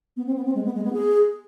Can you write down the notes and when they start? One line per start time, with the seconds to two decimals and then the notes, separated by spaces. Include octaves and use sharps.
0.17 B3
0.27 C4
0.36 B3
0.45 C4
0.55 G#3
0.65 B3
0.75 G#3
0.84 B3
0.93 G#4